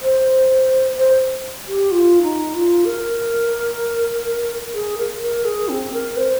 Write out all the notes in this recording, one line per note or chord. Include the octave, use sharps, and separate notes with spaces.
C5
C5
G4
F4
D#4
F4
A#4
G#4
A#4
A#4
G#4
C4
A#4
C5